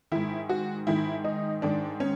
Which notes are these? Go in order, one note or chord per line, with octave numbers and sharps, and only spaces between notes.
G#2 D#3 E4
F#4
G#2 D#3 E4
D#4
G#2 D#3 D4
C#4